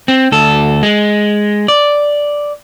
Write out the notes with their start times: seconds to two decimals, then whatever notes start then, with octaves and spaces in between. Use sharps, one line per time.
0.08 C4
0.32 D2 A4
0.83 G#3
1.68 D5